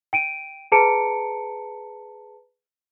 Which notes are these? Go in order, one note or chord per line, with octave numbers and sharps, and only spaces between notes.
G5 D7 D#7
G#4 B4 A5 A#5 C#7 D7